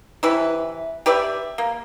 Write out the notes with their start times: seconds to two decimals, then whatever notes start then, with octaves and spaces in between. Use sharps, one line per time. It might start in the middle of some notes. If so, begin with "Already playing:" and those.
0.23 C3 E3 E4 B4
1.06 G4 B4 D5 E5
1.58 A#3